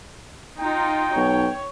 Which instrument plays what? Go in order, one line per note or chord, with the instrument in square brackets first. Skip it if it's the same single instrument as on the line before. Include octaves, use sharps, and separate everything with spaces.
[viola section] D#4 F4 [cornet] G5
[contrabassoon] B1 [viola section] C#5